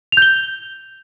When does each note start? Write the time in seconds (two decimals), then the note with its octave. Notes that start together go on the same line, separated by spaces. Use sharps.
0.12 F7
0.17 G6
0.22 G7